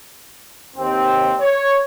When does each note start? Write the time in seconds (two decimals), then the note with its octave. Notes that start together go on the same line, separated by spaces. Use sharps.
0.76 D#2 C4
1.39 C#5